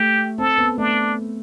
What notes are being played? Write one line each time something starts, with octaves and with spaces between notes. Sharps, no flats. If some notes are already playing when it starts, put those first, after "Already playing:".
Already playing: A3 G4
C4 A4
B3
A3 D4